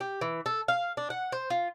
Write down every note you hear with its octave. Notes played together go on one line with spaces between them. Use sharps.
G4
E3
A4
F5
D4
F#5
C5
F4